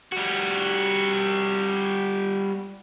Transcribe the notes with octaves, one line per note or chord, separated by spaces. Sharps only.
G3 F#4